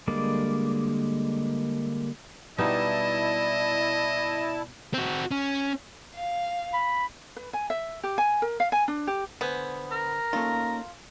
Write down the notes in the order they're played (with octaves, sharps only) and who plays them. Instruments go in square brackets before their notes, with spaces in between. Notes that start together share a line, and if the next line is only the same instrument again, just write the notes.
[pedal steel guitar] D3 G3 G#3 A#3 D5
[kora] B2 G3 D#4 [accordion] E4 A5 [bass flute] D5 [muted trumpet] D#5
[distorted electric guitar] C4 F#4
C#4
[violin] F5
[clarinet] B5
[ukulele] B4
G#5
E5
G4
G#5
A#4
F5
G#5
D4
G4
[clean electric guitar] D3 C5 G#5 [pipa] B3
[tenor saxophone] A#4
[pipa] A3 F4 [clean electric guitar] A#3 C#4 D#4